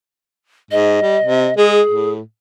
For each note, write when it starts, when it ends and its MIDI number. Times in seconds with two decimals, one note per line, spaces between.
0.71 1.00 44
0.71 1.54 75
1.02 1.17 55
1.23 1.49 48
1.57 1.81 56
1.57 2.11 68
1.91 2.20 45